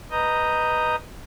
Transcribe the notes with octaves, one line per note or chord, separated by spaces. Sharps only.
B4 D#5 A#5 D#6 G6